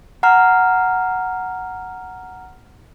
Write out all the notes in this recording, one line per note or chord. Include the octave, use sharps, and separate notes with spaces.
F#5 A#5 F6